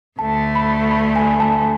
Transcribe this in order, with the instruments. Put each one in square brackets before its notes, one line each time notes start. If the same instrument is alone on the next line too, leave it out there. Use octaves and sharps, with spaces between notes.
[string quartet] D2 D3 A3 [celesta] A5
[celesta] B5
B5
G#5
A5